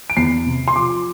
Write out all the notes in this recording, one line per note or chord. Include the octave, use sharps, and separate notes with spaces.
D7
E2 C7
C3
C6
F3 D6